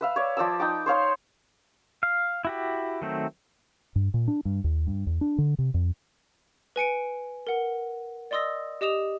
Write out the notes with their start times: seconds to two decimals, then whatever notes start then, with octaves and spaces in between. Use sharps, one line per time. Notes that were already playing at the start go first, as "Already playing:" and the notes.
0.01 B4 E5 F5
0.16 C#5 D5
0.37 F3 D5 D#6 E6
0.60 D#4 G5 D6
0.86 C5 C#5 F5 C6
2.03 F5
2.45 E4 F#4 G4
3.02 D#3 F#3 A3 C4
3.96 G2
4.14 A#2
4.28 D4
4.45 G2
4.64 D#2
4.87 G2
5.07 E2
5.21 D4
5.38 D3
5.59 C3
5.74 F2
6.76 B4 G#5 C#7 D7
7.47 A#4 F#5
8.31 D5 D#5 C6 D#6 E6 A#6
8.81 G4 D#5 D#6 E7 F7